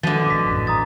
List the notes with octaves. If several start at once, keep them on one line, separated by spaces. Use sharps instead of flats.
B2 D3 D#3 F3 G#3 A6
D#1 G#1 D6 B6
A1 F#2 A2
A#5 D#6 A6